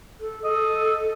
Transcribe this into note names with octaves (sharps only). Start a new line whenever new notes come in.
A4
A4 D#5